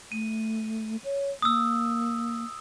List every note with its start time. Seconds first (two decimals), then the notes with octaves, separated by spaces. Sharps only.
0.12 A3 D#7
1.04 C#5
1.42 A#3 D#6 E6